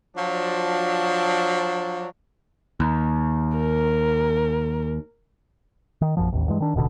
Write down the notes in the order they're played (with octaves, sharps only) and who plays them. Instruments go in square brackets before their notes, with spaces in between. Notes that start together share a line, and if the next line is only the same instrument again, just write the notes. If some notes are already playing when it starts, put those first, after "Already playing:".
[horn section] F3 F#3 D4
[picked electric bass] D#2
[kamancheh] A#4
[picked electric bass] D#3
A#1 F#2 F3
A1 D#2
G2 E3 G#3
D#3 D4
D#1 A1 B2 D3